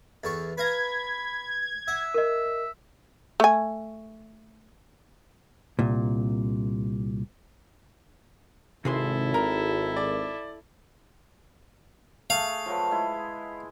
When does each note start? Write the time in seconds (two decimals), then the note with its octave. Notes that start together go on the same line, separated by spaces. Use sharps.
0.24 E2 A4 C#6
0.58 B4 F5 A#5 B5 G#6
1.88 E5 F#5
2.14 A#4 D#5
3.40 A3 G#5
5.79 C2 A#2
8.85 G#1 C3 E4 G#4 A4 C6
9.34 A#4 A#5
9.96 D5
12.30 A3 G#4 F5
12.66 F3 F#3 B4
12.91 G#3 E4